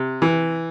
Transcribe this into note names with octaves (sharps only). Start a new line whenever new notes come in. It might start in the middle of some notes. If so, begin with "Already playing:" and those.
Already playing: C3
E3